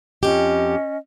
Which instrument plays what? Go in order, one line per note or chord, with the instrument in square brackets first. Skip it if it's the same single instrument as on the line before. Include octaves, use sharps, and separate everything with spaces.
[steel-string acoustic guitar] F2 G4 [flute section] C#4 D#5